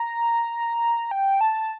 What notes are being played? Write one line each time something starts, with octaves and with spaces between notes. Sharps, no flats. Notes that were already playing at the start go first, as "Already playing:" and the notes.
Already playing: A#5
G5
A5